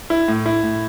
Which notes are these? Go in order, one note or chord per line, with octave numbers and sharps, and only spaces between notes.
E4
A2
E4
A2